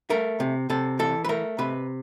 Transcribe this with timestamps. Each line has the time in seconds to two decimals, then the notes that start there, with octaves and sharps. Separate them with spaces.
0.10 A3 A#4
0.40 C3
0.70 C3 A4
0.99 E3 A4
1.25 B4
1.29 A3 A#4
1.58 C3 B4